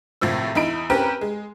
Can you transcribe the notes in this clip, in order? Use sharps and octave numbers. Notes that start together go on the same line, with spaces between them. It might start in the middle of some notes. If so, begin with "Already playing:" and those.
G#1 A2 C3 F3 E6
E2 D#4 E4 B5 D7
C4 C#4 G4 A#4 B4 G5
G#3